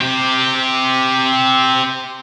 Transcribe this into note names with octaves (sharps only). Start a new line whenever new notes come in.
C4 G4